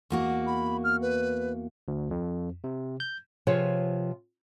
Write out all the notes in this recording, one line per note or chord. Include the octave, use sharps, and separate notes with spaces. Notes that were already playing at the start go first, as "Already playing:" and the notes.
E2 A#3 F#4
B5
F6
B4
D2
F2
C3
G6
C3 F3 F4 G#4 B4 C#5